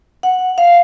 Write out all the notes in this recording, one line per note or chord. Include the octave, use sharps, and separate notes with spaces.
F#5
F5